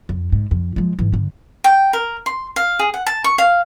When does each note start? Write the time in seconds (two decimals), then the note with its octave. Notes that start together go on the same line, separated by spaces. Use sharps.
0.09 F2
0.32 G#2
0.51 F2
0.76 F3 G#3
0.99 G#2 E3
1.12 G2 D3
1.64 G5
1.93 A#4
2.26 C6
2.56 F5
2.79 G#4
2.94 F#5
3.06 A5
3.24 C#6
3.38 F5